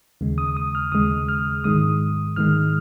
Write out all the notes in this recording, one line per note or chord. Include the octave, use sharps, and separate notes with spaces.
D#2 C#3 G#3
D#6
D#6
F6
D#2 C#3 G#3 D#6
F6
G#2 D#3 G#3 D#6
G#2 D#3 G#3 F6